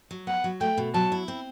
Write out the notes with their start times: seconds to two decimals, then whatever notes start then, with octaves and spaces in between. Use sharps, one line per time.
0.11 F#3
0.27 B3 F#5
0.44 F#3
0.61 A3 G5
0.78 B2
0.94 F#3 A5
1.12 E4
1.28 C4